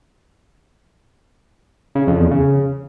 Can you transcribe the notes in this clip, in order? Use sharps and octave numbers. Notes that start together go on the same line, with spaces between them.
C#3
F2
E2
C#3